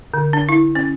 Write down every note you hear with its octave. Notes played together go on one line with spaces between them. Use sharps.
D3
D4
E4
C#4